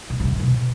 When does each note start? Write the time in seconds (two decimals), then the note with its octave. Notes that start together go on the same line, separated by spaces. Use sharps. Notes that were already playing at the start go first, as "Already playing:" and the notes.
0.10 B2
0.20 B2
0.25 C3
0.40 B2